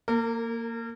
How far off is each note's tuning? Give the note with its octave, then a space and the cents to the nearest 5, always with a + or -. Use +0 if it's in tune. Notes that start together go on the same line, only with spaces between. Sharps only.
A#3 -5 A#4 -35